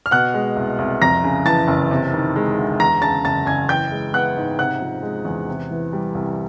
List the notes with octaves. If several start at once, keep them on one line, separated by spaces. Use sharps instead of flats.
F6
B2 F#5 F#6
G#3
C2
C2
F2 A#5 A#6
C#3
E3 A5 A6
F#1
C3
D#3
G#3
D2
E2 A#5 A#6
C#3 A5 A6
F#1 A5 A6
F#1 G#5 G#6
E3 G5 G6
G#3
B3 F#5 F#6
G#2
C3 F#5 F#6
F3
G#3
E2
C3
E3
G3
C2